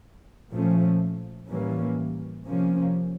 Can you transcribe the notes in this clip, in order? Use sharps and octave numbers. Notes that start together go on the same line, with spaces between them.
A#2 F3 A3 C#4
A2 E3 G3 A#3 C#4
C3 F3 A#3 C#4